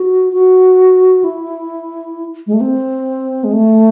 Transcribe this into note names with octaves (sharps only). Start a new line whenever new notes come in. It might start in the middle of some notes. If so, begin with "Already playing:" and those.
Already playing: F#4
F#4
E4
G#3
A3
C4
G#3
A3